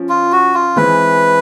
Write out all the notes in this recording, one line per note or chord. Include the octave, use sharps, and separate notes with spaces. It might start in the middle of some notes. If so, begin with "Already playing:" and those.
Already playing: F3 C#4
F4
F#4
F4
E3 G#3 C4 E4 B4